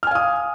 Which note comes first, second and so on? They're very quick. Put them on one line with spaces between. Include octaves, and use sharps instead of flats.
F6 G#5 F5 D#6